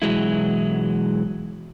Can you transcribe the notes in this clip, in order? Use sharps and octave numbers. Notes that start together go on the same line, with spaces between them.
B2 E3 F#3 G#3 E4